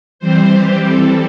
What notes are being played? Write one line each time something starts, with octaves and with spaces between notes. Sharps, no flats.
E3 G3 C4 C5
G4
A4